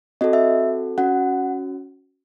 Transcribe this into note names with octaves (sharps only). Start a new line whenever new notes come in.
C4 F#4 A4 D#5
E5
C#4 F#4 F#5